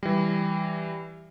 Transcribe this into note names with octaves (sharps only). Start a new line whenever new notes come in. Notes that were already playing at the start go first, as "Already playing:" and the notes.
E3 G3